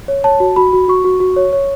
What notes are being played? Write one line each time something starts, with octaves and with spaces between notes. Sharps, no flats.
C#5
C#5 A5
F#4
F#4 B5
F#4
F#4 C#6
F#4
F#4
C#5
C#5